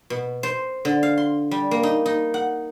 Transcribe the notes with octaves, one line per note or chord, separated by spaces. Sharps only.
B2
C5
D3
F5
C6
G3
A#3
D#4
D#4
F#5